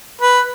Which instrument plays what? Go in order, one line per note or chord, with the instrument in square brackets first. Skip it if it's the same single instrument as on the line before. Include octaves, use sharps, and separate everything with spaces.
[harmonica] B4